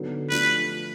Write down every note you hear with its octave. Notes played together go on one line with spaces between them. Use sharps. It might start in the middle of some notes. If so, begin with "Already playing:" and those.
Already playing: D3 F#3 B3 D#4
F3 A3 D4 G4 B4